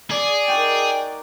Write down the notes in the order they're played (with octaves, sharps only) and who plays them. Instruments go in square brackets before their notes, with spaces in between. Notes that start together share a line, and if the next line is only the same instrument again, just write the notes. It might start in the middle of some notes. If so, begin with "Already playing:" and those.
[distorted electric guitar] G#4 [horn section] D5
[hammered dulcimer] D#4 F#4 A#4 [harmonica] G5